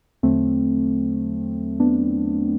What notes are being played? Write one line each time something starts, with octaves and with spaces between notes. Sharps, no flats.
E2 D3 F#3 A3 C4
B3 D4